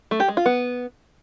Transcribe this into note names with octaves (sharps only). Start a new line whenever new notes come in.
A3
G4
G#3
F4
B3